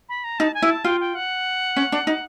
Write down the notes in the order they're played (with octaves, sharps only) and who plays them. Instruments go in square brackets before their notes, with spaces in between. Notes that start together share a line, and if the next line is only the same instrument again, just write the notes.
[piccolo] B5
A#5
[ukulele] D#4 [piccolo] A5
[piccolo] G#5
[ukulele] E4
[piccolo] A5
[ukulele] F4 [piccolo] G5
[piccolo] G5
F#5
[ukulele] C#4
D4
D#4